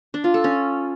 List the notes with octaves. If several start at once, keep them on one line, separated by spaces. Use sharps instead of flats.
D4
F4
A4
C#4